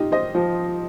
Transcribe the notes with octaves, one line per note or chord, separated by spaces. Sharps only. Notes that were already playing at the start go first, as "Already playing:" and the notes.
Already playing: D#4 F4 G4
C5 D#5
F3